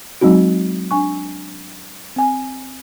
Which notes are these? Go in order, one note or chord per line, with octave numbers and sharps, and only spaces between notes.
F#3 G#3 C4 D#4 F#4
D4 G#5 C#6
C4 G#5